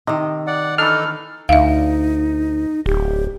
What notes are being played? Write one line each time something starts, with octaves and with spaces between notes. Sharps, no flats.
C3 D#3 D#5
D5 F#5
E3 D4 D#4 A4 F6
D2 D#4 E5 F5
D1 G4